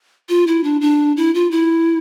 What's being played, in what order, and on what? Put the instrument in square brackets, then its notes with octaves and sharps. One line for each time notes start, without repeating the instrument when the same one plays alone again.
[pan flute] F4
E4
D4
D4
E4
F4
E4